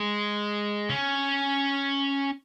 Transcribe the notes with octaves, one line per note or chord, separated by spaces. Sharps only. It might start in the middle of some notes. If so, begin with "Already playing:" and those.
Already playing: G#3
C#4